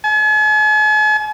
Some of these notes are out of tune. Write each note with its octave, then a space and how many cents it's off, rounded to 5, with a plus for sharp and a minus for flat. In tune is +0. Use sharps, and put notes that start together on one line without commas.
G#5 +45